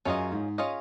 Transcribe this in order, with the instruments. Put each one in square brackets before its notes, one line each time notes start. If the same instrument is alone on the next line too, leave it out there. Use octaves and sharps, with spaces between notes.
[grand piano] F#2 [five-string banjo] C#4 F4 G#4 D#5
[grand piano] G#2
[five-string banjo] C#4 F4 G#4 D#5